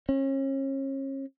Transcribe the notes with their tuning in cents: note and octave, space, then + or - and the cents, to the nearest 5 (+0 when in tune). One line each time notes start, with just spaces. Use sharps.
C#4 -35